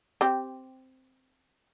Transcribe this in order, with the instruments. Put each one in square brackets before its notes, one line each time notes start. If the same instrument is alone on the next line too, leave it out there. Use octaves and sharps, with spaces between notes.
[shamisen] C4 G4